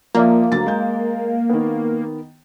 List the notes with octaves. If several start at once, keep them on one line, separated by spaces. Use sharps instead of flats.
F3 A#3 D5 E5
D2 F#3 A6
G#3 G6
D#3 B3